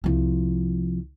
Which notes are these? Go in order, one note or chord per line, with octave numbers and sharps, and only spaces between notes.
C2 F3